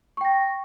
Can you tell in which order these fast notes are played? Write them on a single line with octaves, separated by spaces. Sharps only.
C#6 G5 A#6